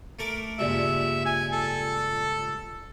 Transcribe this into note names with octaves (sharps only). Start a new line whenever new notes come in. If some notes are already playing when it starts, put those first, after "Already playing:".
A3 A#4 D6
C#2 G2 A#2 E5
G#5
A4